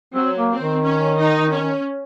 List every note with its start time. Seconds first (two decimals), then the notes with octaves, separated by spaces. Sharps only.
0.14 F#3 C4
0.37 A#3
0.49 C4
0.61 D#3
0.83 C#4
1.18 D#4
1.51 C#4